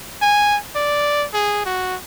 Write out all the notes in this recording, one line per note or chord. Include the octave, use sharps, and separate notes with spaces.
G#5
D5
G#4
F#4